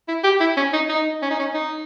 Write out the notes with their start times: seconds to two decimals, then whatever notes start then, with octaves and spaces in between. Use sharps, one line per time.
0.08 E4
0.24 G4
0.40 E4
0.57 C#4
0.73 D#4
0.89 D#4
1.22 C#4
1.31 D#4
1.39 C#4
1.54 D#4